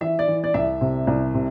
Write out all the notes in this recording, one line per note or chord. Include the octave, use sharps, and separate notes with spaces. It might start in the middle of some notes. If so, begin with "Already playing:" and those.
E3 E5
D5
E3
D5
C2 E5
C3
C2
C3